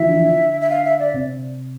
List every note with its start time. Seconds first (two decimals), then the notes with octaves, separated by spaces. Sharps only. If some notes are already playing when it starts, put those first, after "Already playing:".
Already playing: D3 E3 F3 E4 F4 E5
0.09 D4
0.14 E3 E4
0.25 D3 D4
0.61 E5
0.70 F5
0.84 E5
0.99 D5
1.14 C3 C4